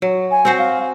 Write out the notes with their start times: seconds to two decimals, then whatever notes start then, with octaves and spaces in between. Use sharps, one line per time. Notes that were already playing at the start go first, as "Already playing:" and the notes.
0.02 F#3
0.31 G#5
0.45 C4 F#4 C5
0.59 F5